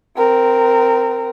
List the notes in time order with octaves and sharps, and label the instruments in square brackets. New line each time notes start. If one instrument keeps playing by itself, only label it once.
[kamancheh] C4 A#4